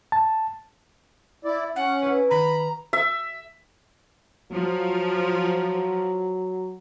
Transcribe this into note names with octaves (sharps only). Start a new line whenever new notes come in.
A5
E4 D5
C#4 F#5
E4 B4
D#3 A#5 B5
E5
F3 F#3